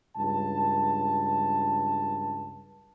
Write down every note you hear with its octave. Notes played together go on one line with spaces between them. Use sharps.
C#2 G2 A5